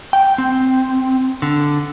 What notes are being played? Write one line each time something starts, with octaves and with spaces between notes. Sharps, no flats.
G5
C4
D3